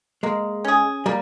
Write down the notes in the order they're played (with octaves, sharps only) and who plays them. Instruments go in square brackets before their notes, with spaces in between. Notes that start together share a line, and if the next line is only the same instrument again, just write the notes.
[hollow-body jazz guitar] G#3 [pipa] A#3
[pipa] C#4 G#4
[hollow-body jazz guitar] G3 [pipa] A#3